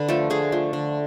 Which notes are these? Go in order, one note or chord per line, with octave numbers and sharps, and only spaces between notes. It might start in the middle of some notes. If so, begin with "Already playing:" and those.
Already playing: D3 B4
F3 A3 A4
D3 G#4
F3 A3
D3